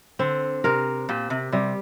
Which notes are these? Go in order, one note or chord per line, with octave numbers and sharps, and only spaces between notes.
D3 C4
C3 A#4
A#2 G4
C3
C3 G3